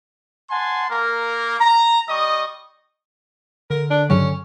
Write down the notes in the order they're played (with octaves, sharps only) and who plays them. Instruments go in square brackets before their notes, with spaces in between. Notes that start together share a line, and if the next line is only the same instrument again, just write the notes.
[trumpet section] F#5 G#5 A5 C6
A#3 A#4
A#5
G3 D#5 C#6 D#6
[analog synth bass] D3 [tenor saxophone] A#4
[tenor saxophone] D4
[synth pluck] G2 C#3 F#3 [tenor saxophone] C#4